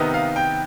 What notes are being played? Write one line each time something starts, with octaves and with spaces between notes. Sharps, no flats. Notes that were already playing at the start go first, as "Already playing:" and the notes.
Already playing: C3 D#3 B3 D#4
F5
G5